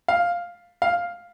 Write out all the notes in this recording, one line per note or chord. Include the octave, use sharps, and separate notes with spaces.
F5
F5